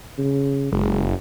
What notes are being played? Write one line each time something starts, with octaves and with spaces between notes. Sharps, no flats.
C#3
F#1 G#3